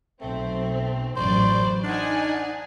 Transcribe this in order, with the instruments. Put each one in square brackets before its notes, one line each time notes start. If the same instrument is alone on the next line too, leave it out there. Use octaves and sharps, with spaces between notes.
[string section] B1 C4 [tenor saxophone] A3
[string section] A1 F#2 D5 [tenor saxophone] C5
[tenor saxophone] D4 [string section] D#4 F#5 G#5